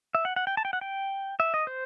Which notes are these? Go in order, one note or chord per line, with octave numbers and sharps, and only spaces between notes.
E5
F#5
F#5
G5
A5
G5
F#5
G5
E5
D#5
C5